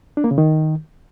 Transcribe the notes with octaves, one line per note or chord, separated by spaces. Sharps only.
D4
A#3
C#3
D#3